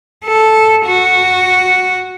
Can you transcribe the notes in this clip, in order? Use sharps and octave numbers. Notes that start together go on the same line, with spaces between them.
A4
F#4